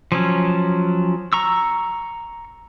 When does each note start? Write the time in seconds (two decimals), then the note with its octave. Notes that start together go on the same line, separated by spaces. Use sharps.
0.12 F3 F#3 C#4
1.33 A#5 C#6 E6